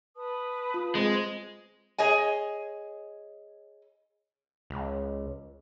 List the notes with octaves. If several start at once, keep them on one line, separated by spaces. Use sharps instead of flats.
B4 A5 D#6
F4
G#3 C4 C5 G#5
G#4 C#5 D#5 G#5
C#2